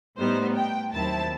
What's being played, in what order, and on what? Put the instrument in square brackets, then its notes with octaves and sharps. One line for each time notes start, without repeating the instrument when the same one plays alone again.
[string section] A2 G3 B3 D#4 C5
G5
D#2 D#3 F#3 C4 E4 A5